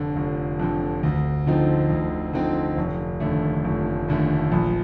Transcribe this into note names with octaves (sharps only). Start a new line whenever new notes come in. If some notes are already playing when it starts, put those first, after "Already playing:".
Already playing: F1 F2 D3
F1
F2 D3
D2
D3 F3 C4 D#4
D2
D3 F3 C4 D#4
F1
D#2 D3 A3
F1
D#2 D3 A3
A#1